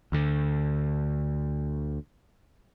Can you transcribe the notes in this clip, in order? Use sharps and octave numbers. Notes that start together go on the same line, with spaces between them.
D2 D3